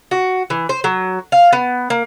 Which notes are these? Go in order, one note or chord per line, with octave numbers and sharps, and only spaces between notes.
F#4
E3
C5
F#3
F5
B3
A#3